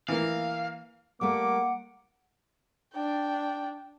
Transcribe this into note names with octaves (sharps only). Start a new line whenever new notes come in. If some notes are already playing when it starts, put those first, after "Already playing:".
E3 A#3 F5
G3 A3 A#3 F#5 D6
D4 G5